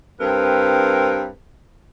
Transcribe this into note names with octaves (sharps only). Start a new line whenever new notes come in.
G2 C4 A#4 B4